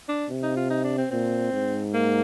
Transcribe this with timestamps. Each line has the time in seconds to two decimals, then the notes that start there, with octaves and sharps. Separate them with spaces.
0.09 D4
0.30 C3
0.43 D#4
0.57 F4
0.70 D#4
0.84 D4
0.98 C4
1.11 A#2 C4
1.53 G#2
1.94 A#3